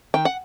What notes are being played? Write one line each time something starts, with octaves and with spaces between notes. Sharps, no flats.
D#3 G5
F#5